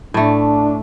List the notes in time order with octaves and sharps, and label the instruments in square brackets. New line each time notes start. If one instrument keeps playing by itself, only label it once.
[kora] A2 A3 [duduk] D4